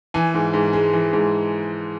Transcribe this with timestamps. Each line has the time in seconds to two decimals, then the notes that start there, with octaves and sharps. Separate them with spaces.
0.14 E3 G#5
0.34 G#2
0.54 G#2
0.73 G#3
0.93 E3
1.13 G#2